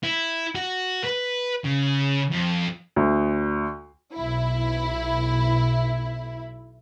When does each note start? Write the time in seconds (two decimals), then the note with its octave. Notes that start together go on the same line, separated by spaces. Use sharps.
0.03 E4
0.55 F#4
1.05 B4
1.65 C#3
2.32 F2
2.96 D2
4.14 B1 E4